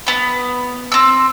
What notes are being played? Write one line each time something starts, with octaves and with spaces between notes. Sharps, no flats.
B3 B5
C4 E6